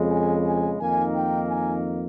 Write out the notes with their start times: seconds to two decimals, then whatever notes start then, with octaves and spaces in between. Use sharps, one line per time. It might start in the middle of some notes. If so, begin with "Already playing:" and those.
Already playing: F2 C#3 G#3
0.10 G#5
0.46 G#5
0.80 F2 D#3 A#3 D#4 G#5
1.14 G5
1.49 G#5